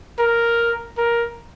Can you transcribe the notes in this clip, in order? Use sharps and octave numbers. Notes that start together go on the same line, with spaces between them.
A#4
A#4